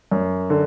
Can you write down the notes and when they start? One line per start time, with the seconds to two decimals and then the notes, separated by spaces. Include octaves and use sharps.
0.11 F#2
0.50 D3